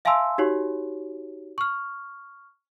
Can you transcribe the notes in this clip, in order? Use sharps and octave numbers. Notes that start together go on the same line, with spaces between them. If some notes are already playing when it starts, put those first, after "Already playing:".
E5 F5 G#5 A5 C6 E6
D#4 F#4 G4 C#5
C#6 F6